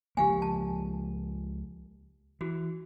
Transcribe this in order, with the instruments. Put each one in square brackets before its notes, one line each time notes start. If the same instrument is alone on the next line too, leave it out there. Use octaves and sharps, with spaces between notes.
[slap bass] C#2 F3 A#3 [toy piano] G4 F5 G#5
[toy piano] A5
[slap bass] E3 [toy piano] F#4